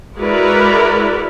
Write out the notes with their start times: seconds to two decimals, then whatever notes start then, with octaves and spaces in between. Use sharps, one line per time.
0.17 G#3 E4 F#4 A#4 B4 D5